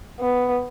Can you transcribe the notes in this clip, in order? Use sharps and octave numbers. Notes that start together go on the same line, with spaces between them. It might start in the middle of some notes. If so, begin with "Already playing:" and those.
B3